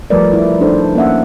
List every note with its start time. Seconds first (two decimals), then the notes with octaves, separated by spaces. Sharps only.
0.10 F3 G3 A3 A#4 B4 D5
0.33 E4
0.61 D4 D#4 A4 C5
0.95 A#3 C#4 E5 F#5